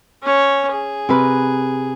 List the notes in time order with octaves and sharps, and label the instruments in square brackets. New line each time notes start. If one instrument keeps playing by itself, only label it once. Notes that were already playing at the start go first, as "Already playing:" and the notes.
[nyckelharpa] C#4 C#5
G#4
[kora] C3 A#4 B4